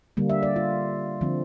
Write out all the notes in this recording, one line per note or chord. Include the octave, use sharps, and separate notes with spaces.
D3 G3 A#3
E5
D5
F4
D3 F3 C4